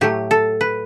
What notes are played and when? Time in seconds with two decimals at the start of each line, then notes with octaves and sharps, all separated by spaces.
0.01 A2 F#3 A3 G4
0.31 A4
0.61 B4